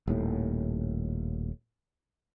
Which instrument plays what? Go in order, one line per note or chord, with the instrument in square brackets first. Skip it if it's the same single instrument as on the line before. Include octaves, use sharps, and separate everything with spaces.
[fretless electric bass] D#1 D#2 A2